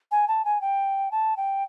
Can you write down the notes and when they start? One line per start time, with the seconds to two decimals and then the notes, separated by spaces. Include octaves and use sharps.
0.11 G#5
0.28 A5
0.45 G#5
0.61 G5
1.12 A5
1.37 G5